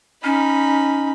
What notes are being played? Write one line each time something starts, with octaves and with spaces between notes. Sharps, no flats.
C#4 D#4 B5